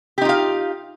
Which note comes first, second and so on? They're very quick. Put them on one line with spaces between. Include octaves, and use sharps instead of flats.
G4 D#4 F4 F5